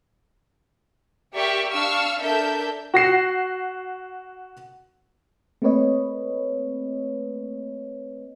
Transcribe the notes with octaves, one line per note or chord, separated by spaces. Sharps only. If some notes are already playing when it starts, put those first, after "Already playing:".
G4 A#4 D5 E5 C#6
D4 F5 C#6 E6 F6
D4 A4 A#4 E5 G6
F#4 A#6 C7 E7
A3 A#3 C4 B4 C#5 D#5